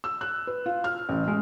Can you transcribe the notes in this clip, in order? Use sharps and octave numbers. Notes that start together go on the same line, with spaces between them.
E6
F#6
B4
F4
F6
A1
G#3